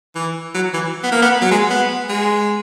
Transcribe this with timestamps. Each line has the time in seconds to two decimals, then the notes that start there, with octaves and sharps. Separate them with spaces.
0.16 E3
0.55 F#3
0.74 E3
1.03 B3
1.12 A#3
1.22 B3
1.42 F#3
1.51 G#3
1.70 B3
2.09 G#3